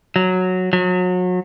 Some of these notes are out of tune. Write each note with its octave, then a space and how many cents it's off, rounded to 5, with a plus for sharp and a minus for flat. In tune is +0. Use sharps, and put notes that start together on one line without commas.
F#3 -5
F#3 -30